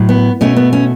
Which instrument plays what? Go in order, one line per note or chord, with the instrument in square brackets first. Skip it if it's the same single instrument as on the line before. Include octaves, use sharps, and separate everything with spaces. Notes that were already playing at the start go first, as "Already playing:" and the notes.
Already playing: [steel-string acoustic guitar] A2 F#3
B3
B2 A3 C#4
B3
C#4